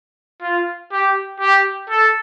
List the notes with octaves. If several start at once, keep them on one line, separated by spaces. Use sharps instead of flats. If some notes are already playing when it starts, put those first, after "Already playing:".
F4
G4
G4
A4